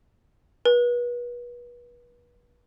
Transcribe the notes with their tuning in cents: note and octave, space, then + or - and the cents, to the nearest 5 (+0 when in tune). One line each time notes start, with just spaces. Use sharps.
B4 -35